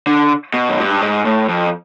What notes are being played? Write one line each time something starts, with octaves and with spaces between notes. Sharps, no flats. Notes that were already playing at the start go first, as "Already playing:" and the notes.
D3
B2
F#2
G2
G#2
A2
F2